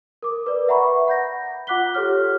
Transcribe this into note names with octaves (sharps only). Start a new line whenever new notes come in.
A#4 D6
B4 D5
E5 F#5 A#5 B5 C#6
F#5 G6 A#6
F4 F#5 D6 F#6 B6 G7
G4 A4 C#5 F6